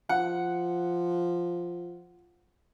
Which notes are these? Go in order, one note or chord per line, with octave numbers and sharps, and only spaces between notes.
F3 F#5